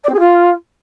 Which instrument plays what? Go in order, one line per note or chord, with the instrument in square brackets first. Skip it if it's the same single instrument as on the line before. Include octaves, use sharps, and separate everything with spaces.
[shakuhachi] D5
C4
G#4
F4